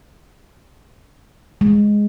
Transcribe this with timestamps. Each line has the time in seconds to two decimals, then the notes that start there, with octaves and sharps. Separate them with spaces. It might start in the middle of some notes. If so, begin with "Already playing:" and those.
1.61 G#3